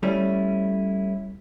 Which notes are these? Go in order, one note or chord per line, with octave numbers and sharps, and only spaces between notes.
G3 A3 C#4 E4